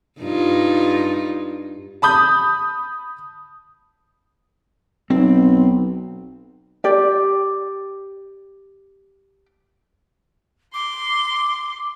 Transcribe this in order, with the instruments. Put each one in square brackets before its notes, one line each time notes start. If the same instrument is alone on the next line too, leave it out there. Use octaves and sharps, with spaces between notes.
[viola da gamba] G2 D#4 F4
[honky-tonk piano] A5 B5 D#6 G6
[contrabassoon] B1 [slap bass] C4
[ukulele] G4 D5
[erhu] C6 [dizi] D6